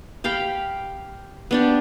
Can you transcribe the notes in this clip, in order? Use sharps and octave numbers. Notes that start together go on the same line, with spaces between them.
G4 F5 G5 B5
B3 D4 G4